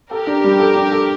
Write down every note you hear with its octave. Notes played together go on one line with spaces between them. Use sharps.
G4 A4 A#4
D4
G3
A4
D4
A4